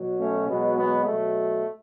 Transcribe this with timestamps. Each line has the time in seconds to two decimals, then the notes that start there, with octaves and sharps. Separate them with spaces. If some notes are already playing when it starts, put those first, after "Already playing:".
Already playing: B2 F#3
0.19 A3 C#4
0.47 B2 F#3 G#3 B3
0.77 G#3 B3
1.05 B2 F#3 A3